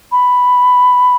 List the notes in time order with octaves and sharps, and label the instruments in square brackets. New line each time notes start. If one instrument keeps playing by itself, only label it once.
[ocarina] B5